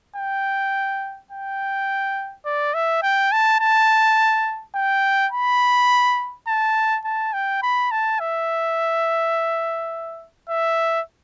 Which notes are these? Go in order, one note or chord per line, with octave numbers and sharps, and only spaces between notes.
G5
G5
D5
E5
G5
A5
A5
G5
B5
A5
A5
G5
B5
A5
E5
E5